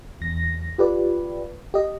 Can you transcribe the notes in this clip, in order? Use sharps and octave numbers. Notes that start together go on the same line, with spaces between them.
E2 A#6
F4 G4 B4 D5
G4 D#5